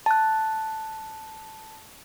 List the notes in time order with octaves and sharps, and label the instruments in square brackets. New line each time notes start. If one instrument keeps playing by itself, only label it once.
[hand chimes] A5 F#6